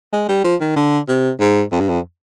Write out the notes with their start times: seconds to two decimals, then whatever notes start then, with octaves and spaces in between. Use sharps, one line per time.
0.13 G#3
0.28 G3
0.44 F3
0.61 D#3
0.76 D3
1.08 C3
1.40 G#2
1.72 F2
1.80 G2
1.88 F2